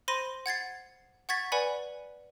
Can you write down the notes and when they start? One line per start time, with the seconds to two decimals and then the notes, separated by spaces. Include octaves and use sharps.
0.08 C5 B5 C6 A#6 D#7
0.46 F#5 G#6 A6 C7
1.29 F#5 C#6 G#6 A6 B6
1.52 B4 D5 F#5 G#5 B5